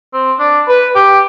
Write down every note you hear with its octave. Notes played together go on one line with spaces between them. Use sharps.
C4
D4
B4
G4